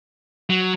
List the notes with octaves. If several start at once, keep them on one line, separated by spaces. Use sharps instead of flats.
F#3